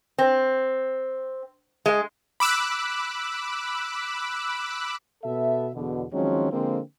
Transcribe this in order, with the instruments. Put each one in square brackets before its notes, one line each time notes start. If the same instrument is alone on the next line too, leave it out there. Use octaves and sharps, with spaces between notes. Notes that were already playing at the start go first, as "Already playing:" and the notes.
[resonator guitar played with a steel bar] C4
G#3
[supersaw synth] B5 D6 E6 F#6
[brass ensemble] B2 B3 A4 E5
E2 B2 D3
D#3 F3 F#3 G#3 C4 C#4
D3 F3 G#3 A#3 C4